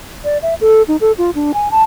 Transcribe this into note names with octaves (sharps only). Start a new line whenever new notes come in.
D5
E5
A4
D#4
A4
F4
D4
G#5
A5